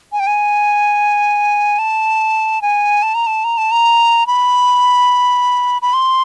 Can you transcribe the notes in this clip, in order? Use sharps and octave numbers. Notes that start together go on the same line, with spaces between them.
G#5
G5
G#5
A5
G#5
A5
A#5
A5
A#5
A5
A#5
B5
B5
C6